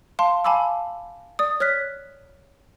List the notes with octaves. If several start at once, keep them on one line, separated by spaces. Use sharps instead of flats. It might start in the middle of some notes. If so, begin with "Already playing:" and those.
F5 A5 C6
F5 G#5 A5 B5 D6 E6
D5 D#6
C#5 F6 F#6 B6